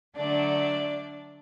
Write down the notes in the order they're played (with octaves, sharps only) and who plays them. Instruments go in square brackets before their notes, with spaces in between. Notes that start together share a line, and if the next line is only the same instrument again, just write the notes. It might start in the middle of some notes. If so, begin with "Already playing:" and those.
[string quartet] D3 F#3 A3 D4 D5